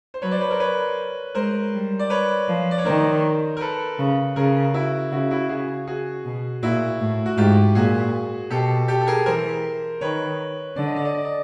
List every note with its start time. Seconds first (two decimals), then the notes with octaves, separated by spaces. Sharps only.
0.14 C5
0.22 F#3 B4 C#5
0.31 C5 D5
0.41 B4 C#5
0.50 A#4 C5
0.60 B4 C#5
1.35 G#3 A#4 C5
1.73 G3
1.99 D5
2.10 B4 C#5
2.48 F3
2.71 D5
2.78 C#5
2.85 D#3 A#4 C5
3.57 A#4
3.61 A4 B4
3.99 C#3
4.36 C#3 G#4 A#4
4.74 E4 F#4
5.12 C#3 E4 F#4
5.31 E4 F#4
5.49 C#3 F#4 G#4
5.87 F#4 G#4
6.25 B2
6.63 A#2 E4 F#4
7.00 A2
7.26 F#4
7.38 G#2 F4 G4
7.75 A#2 F#4 G#4
8.50 B2 G4 A4
8.88 G4 A4
9.01 A4
9.07 G#4 A#4
9.26 E3 A#4 C5
10.01 D#3 B4 C#5
10.76 D3 D5
10.86 D#5
10.96 D5
11.05 D#5
11.15 D5
11.25 D#5